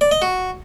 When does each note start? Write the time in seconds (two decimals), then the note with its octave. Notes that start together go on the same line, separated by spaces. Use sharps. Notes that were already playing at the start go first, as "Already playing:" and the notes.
0.01 D5
0.11 D#5
0.22 F#4